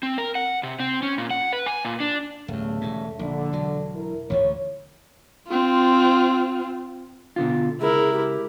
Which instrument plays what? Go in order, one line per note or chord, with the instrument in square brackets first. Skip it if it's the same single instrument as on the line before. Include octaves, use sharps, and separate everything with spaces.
[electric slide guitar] C4
A#4
F#5
C3
C4
C#4
A#2
F#5
B4
G#5
A#2
D4
[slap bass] D1 E2 [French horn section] C#3 G3 A3
[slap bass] E1 G#2
[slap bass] A#1 [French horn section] D3
[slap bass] E1 F#3
[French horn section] E4 A#4
[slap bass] A1 D2 F3 [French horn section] C#5
[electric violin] C4 F4
[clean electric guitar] B2 D3 F4
[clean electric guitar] C#2 [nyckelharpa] E4 A#4 [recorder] G#4
[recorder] G4